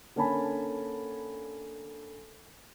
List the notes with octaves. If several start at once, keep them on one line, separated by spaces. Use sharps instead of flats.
D3 A#3 C#4 G#5 A5 B5